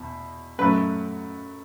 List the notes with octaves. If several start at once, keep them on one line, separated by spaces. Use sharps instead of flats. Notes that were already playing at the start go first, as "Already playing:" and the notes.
Already playing: E2 B2
F#2 F#3 A3 B4